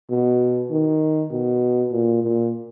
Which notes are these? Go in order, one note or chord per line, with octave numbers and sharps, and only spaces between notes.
B2
D#3
B2
A#2
A#2